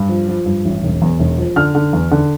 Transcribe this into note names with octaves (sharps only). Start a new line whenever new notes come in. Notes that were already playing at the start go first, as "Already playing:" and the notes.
Already playing: G2
F3
F3
G2
A1
E1
E2
E1
F3
D3 F6
D3
E2
D3